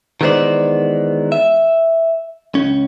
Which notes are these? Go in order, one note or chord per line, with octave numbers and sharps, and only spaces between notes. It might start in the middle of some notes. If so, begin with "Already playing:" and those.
D#3 E3 G#3 B3 C5 D5
E5
C#2 C#4